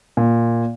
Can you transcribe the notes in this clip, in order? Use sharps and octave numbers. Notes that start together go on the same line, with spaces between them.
A#2